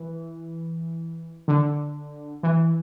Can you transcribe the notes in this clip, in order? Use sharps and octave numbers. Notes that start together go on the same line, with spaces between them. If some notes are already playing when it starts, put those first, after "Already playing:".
Already playing: E3
D3
E3